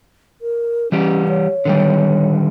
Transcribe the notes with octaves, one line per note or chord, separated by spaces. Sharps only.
A#4
E3 G3 C#4 G4
C#5
D3 D#3 G3